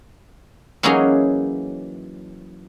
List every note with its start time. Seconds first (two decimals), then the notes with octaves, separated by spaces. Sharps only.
0.83 E3 F#3 A#3 C#4 D#4 G#4